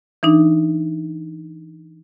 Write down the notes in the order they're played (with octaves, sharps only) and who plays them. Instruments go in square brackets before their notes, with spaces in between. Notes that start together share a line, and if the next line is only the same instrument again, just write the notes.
[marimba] E3 D4 D#4